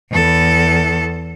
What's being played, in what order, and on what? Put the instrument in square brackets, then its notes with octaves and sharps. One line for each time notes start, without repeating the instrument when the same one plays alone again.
[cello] E2 A4